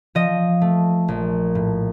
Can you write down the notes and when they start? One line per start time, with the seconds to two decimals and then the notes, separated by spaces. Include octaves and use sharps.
0.15 F3 D#5
0.61 A3
1.08 A#1
1.55 A2